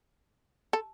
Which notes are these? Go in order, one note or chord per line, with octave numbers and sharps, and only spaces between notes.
A4